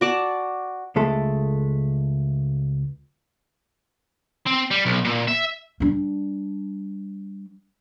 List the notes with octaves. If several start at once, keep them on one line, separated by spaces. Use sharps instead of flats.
F#4 D5 A5
C#2 G#3 A3 A4
C4
G3
B1
A#2
E5
G3 D4